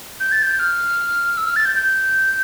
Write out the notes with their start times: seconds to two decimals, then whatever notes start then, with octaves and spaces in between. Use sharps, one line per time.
0.20 G6
0.32 A6
0.43 G6
0.60 F6
1.37 E6
1.46 F6
1.56 A6
1.65 G6
1.75 G6